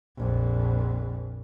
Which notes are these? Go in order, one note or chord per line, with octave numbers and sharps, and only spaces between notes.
A#1 F2